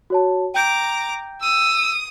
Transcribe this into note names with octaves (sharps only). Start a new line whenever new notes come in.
F#4 C#5 A5
G5 A#5 D6 G6 D7
D#6 E6